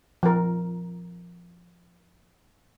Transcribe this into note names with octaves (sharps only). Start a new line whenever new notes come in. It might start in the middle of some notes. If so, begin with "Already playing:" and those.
F3 A#4